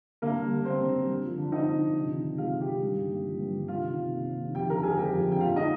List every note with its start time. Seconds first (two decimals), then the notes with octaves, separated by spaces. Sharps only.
0.22 D3 A#3 A#4
0.37 G3
0.51 D3
0.65 A#3 C4 C5
0.81 D3
0.94 G3
1.09 D3
1.23 F3
1.38 D3
1.52 C4 D#4 D#5
1.67 D3
1.81 F3
1.95 C3
2.10 D#3
2.24 C3
2.38 G#3 F4 F5
2.52 C3
2.61 G4 G5
2.67 D#3
2.82 G2
2.96 D3
3.11 A#3
3.25 F3
3.40 G2
3.55 D3
3.68 C3 F4 F5
3.83 D#3
3.98 C3
4.12 A#3
4.25 C3
4.40 D#3
4.55 F2 G4 G5
4.69 D3 A#4 A#5
4.83 C4 G#4 G#5
4.98 G#3 G4 G5
5.12 F2
5.27 D3 G5
5.41 A#2 F4 F5
5.56 G#3 D#4 D#5